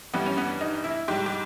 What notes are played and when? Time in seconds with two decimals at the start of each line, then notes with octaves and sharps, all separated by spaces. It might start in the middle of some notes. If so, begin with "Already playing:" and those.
0.14 G2 E3 G3 B3
0.26 C#4
0.38 B3
0.61 D#4
0.84 E4
1.08 G#2 G3 G4
1.26 G4